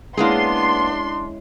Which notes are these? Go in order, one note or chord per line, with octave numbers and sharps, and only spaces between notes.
G#3 A#3 B3 C#4 D4 E4 G#4 C6